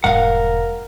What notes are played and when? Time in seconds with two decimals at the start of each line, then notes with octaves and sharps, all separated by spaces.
0.04 E1 G#2 G3 A#4 F5 F#5